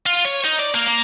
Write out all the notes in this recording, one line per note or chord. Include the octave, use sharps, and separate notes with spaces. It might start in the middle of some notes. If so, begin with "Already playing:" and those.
F4
C#5
D#4
D5
A#3
A#3